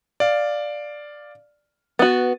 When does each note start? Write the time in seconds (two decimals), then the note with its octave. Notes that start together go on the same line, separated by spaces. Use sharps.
0.20 D5 F5
1.99 B3 F#4 A6